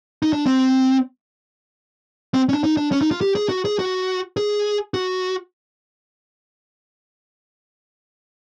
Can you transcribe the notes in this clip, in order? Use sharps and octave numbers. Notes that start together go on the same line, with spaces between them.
D#4
D4
C4
C4
C#4
D4
D#4
D4
C#4
D#4
F4
G4
G#4
F#4
G#4
F#4
G#4
F#4